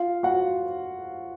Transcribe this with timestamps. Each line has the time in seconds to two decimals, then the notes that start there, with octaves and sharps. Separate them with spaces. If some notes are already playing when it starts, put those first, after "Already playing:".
Already playing: F4 F5
0.23 F#4 F#5